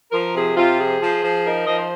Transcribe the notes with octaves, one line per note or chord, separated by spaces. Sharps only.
F3 A#4
C3 G#4
C3 F4
F3 G#4
F3
F3
D#4 A#4
F3 D#5
C5